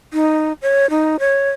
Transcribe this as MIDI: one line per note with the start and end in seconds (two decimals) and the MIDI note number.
0.13 0.53 63
0.62 0.89 73
0.90 1.16 63
1.19 1.49 73